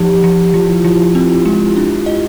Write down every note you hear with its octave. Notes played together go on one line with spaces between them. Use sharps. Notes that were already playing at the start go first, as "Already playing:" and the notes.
Already playing: F3 D#4 G4
F3
F3 F4
E4
F3 F4
C4
G#3
D4
D#5